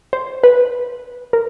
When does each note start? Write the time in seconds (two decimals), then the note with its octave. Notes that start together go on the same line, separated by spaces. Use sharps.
0.13 C5
0.43 B4
1.33 A#4